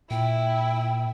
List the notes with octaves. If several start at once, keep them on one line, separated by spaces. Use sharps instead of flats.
A#2 E4 G5